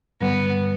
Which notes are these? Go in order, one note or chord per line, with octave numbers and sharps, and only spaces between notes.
G2 D3 G3 B3